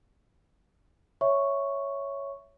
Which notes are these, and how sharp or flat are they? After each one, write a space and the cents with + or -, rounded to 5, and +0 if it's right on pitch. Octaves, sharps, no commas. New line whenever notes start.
C#5 +0 E5 +0 C#6 +0